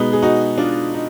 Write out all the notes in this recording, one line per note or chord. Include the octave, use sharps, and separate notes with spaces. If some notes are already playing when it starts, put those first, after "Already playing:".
Already playing: B2 G#3 B3 D#4
G#4
D#4 F#4
D4 F4
D#4